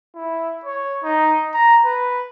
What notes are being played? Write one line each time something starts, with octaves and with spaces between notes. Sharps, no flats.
E4
C#5
D#4
A#5
B4